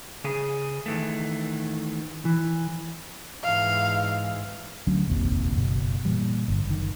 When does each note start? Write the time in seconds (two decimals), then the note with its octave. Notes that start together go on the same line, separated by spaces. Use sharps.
0.24 C#3 G#4
0.86 D#3 E3 A3
2.25 E3
3.44 G#2 E3 F5
4.87 D2 F#3 C#4
5.07 F1 A#1 D#2 C3
5.56 F#1 B2
6.05 A#2 E3 G3
6.48 G1
6.67 F#1 D#3